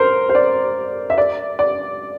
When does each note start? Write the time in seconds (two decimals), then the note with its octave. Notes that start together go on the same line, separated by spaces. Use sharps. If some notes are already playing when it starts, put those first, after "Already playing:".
Already playing: A#4 C5
0.29 C5
0.35 D5
1.10 E5
1.18 D5
1.59 D5